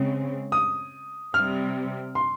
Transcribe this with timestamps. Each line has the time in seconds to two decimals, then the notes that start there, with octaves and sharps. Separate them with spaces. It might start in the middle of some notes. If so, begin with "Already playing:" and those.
Already playing: C#3 G#3 C4
0.52 D#6
1.34 C3 G3 C4 F6
2.15 C6